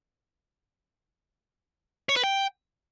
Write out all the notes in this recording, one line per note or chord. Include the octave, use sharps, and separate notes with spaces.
C#5
B4
G5